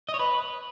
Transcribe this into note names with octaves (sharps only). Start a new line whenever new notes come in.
D#5
C#5
B4